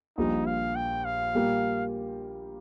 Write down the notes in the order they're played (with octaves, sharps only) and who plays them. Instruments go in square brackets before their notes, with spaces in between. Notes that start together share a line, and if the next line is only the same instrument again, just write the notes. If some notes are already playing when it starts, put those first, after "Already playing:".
[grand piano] A#1 A#2 G3 [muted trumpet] D#4
[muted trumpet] F5
G5
F5
[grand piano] A#2 G3 A#3 G4